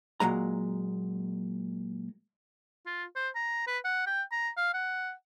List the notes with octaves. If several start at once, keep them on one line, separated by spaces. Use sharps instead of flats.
A#2 F#3 G#3 A#5
F4
C5
A#5
B4
F#5
G5
A#5
F5
F#5